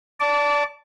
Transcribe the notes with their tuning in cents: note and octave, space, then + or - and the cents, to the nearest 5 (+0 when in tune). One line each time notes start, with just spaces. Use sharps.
D5 -20 A5 +0 D6 -25